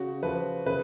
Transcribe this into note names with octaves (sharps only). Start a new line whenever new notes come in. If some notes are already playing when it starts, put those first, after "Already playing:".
Already playing: C#3 F#4
F3 B4
C#3 B4